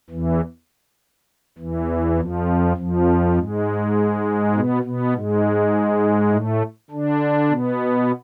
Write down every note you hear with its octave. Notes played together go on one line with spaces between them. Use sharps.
E2 E3
E2 E3
F2 F3
F2 F3
G#2 G#3
B2 B3
B2 B3
G#2 G#3
A2 A3
D3 D4
B2 B3